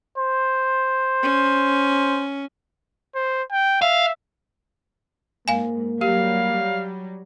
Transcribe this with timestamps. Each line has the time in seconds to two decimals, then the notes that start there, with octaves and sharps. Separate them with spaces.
0.18 C5
1.23 C#4
3.15 C5
3.52 G5
3.82 E5 F5
5.48 G#2 A#3 F5 G#5
6.01 F#3 G3 G4 F5